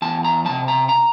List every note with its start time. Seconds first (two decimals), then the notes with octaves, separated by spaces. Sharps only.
0.02 E2 A5
0.25 A#5
0.45 C3 F3 A5
0.68 A#5
0.89 A#5